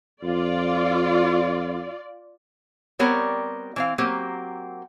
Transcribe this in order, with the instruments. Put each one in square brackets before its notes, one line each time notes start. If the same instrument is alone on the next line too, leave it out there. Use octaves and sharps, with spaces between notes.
[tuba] F2 [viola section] F4 D5
[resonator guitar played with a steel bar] G3 B3 C4 A#4 C#5 D5
E3 C4 F5
F#3 A#3 C4 G4